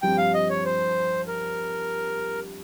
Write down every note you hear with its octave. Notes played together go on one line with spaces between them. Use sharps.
G2 F3 C4 G4 G5
F5
D#5
C#5
C5
A#4